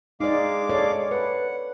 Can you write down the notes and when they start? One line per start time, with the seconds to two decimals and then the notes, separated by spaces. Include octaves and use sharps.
0.20 G#3 D#4 D5 F5 D6
0.69 A4 C#5 D5
1.11 B4 F#5